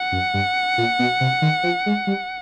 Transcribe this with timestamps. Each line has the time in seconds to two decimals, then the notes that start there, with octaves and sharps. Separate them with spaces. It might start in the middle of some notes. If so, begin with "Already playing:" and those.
Already playing: F#5
0.12 F#2
0.34 G2
0.78 A#2
0.99 B2
1.21 C3
1.42 D#3
1.63 F3
1.86 G#3
2.07 G3